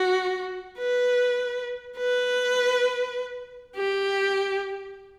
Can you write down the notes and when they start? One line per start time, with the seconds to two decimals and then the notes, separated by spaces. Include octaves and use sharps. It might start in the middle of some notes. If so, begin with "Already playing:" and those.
Already playing: F#4
0.79 B4
1.98 B4
3.76 G4